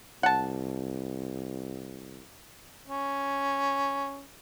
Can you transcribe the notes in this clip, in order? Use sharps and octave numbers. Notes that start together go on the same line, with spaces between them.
C2 F#5 A5
C#4